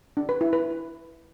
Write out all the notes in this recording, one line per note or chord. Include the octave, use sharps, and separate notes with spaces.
D4
B4
E4
B4